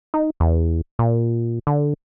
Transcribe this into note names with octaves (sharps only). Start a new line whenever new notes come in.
D#4
E2
A#2
D3